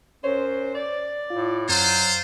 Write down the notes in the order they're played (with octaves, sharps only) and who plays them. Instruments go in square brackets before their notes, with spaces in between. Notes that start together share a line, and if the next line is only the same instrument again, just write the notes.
[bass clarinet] F#2 [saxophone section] C5 [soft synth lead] C#5
[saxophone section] D5
[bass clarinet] A2 [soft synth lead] F4
[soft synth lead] F#2 [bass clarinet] F#3 [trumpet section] F4 C5